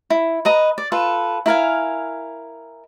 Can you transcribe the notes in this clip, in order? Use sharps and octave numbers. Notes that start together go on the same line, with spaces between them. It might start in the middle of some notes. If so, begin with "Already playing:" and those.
E4
B4 D#5 A#5
D5
F4 A4 B4
E4 A#4 F5 G#5